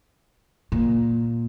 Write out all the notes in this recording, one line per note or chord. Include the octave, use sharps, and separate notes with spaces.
A#2